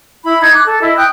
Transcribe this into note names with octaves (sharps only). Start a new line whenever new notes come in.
E4 B5
D#4 G#6
D6 F#6
A4
E4 D#5
G5 D#6 F#6 G6